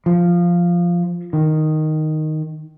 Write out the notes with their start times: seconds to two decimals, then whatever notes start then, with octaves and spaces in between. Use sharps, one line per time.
0.06 F3
1.33 D#3